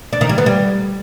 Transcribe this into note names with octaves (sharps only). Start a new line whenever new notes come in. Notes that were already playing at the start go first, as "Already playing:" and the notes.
D4
D#3
G3
B3
G3